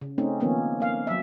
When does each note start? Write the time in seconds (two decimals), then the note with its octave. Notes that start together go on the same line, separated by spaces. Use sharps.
0.01 C#3
0.18 A3 C4 C#4 D#4
0.40 D#3 F3 A#3 B3 C#4
0.80 A#3 F5
1.07 F#3 E5